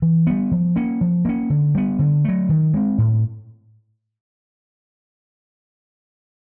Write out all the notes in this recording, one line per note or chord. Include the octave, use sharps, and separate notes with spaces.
E3
G3 B3
F3
A#3 C#4
F3
A#3 C#4
D3
G3 B3
D3
F#3 A3
D#3
G#3 C4
A2